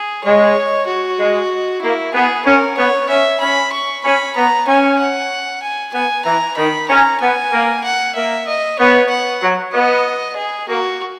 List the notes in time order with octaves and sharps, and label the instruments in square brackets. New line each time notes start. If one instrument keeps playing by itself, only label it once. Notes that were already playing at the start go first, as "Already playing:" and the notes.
Already playing: [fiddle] G#4
[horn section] G#3 [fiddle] C#5
[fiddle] F#4
[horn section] G#3
[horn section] A#3 [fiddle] E4
[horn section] B3 [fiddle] G#4
[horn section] C#4 [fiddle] A#4
[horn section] B3 [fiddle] C#5
[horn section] C#4 [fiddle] E5
[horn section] C#4 [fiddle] B5
[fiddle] C#6
[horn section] C#4 [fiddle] B5
[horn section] B3 [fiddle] A#5
[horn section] C#4 [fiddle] G#5
[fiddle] F#5
G#5
[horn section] B3 [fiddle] G#5
[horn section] E3 [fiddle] A#5
[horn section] D#3 [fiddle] B5
[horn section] C#4 [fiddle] A#5
[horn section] B3 [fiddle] G#5
[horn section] A#3
[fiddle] F#5
[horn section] A#3 [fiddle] E5
[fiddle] D#5
[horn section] B3 [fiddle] C#5
[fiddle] F#5
[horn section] F#3
[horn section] B3 [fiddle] D#5
[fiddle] G#4
[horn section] A#3 [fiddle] F#4